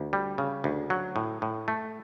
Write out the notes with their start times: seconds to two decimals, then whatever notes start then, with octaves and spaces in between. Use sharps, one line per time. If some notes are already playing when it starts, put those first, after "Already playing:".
Already playing: D2
0.13 G3
0.38 C#3
0.64 D2
0.90 F#3
1.16 A2
1.42 A2
1.68 A3